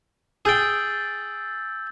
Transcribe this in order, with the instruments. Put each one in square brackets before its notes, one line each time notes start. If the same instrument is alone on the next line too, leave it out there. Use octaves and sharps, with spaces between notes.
[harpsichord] G#4 G5 [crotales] E6 G6 A6